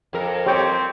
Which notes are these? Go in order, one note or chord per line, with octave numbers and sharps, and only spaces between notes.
F2 A#4
C4 G4 C#5 G5